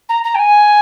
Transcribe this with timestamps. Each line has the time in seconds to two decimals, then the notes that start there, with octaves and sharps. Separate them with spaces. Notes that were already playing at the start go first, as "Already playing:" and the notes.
0.09 A#5
0.24 A#5
0.35 G5
0.39 G#5